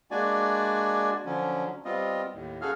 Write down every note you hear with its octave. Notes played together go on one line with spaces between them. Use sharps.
G#3 A#3 D4 F#4 D5 G#5
D3 F3 F#3 C#4
G3 B3 C4 F4 D#5
D#2 A2
F#2 F#4 G#4 A4 F5 F6